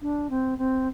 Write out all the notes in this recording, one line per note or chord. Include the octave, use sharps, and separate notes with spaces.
D4
C4
C4